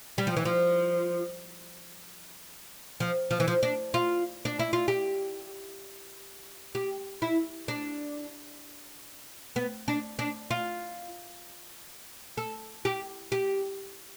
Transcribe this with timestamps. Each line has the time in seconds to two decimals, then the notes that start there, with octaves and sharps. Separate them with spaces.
0.18 G3
0.27 F3
0.37 E3
0.45 F3
3.00 F3
3.31 F3
3.40 E3
3.48 F3
3.63 D4
3.94 F4
4.45 D4
4.59 E4
4.73 F4
4.88 G4
6.75 G4
7.22 E4
7.68 D4
9.56 B3
9.88 D4
10.19 D4
10.51 F4
12.37 A4
12.85 G4
13.32 G4